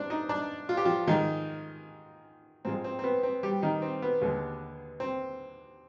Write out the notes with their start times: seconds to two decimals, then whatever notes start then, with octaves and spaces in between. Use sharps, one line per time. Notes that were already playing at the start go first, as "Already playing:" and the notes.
Already playing: G#2 C4 D4 D5
0.10 D#4 D#5
0.29 D4 D5
0.69 F4
0.77 G4
0.85 F3 F4
1.07 G#2 D#3 F3 G#3 D#4
2.65 G#2 F3 G#3 C4
2.84 C4
2.99 C4
3.04 B3
3.23 C4
3.43 G3 G4
3.62 D#3 D#4
3.82 C4
4.02 B3
4.21 D#2 D3 G#3
5.00 C4